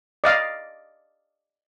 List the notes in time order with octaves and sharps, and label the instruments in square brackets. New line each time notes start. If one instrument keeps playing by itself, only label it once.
[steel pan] D5 D#5 F5